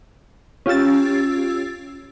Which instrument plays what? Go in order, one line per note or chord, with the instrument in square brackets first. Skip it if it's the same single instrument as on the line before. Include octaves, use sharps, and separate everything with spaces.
[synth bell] C#4 F4 G4 E6 A6